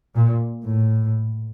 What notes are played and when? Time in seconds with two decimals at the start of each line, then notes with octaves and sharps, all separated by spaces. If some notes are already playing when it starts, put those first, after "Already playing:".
0.16 A#2
0.64 A2